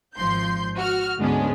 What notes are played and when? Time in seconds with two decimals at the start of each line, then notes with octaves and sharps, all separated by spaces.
0.16 G#1 F3 C6 G6
0.77 F#4 F6
1.18 D2 G#2 G#3 B3 C#4 D4